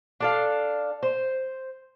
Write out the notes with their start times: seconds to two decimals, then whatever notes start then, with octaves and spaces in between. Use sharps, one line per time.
0.20 D4 A4 F5
1.03 C5